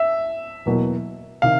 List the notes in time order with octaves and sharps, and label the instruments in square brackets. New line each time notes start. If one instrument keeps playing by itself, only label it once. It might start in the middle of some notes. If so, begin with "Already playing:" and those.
Already playing: [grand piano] E5
[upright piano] E2 B2 F#3 A#3
[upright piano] C3 D#3 [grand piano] F5